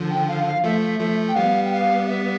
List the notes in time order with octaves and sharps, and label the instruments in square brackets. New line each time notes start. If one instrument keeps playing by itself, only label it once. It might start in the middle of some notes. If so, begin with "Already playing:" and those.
Already playing: [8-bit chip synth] D3 F3
[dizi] G5
F5
F5
[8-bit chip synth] F3 A3 [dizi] E5
[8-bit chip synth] F3 A3
[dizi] G5
[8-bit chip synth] G3 B3 [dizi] F5
[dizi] G5
F5
E5